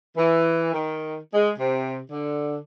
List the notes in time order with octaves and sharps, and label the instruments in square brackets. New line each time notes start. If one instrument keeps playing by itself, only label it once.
[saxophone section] E3
D#3
G#3
C3
D3